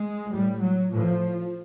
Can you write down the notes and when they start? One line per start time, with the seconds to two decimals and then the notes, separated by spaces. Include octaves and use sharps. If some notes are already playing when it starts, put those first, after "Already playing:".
Already playing: G#3
0.32 A2 G3
0.62 F#3
0.92 A2 F3